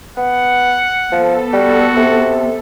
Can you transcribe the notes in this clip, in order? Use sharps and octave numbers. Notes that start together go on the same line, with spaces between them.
B3 F#5
F3 B3 A4
G3 F#4
C3